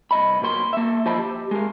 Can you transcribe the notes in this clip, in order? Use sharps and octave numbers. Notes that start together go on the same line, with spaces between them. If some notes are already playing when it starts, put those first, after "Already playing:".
C2 D#5 B5
B1 A#2 F#3 A#4 C6
A#3 E5
D#2 F3 C5 D#5 A5 B5
G4
G#3 A#4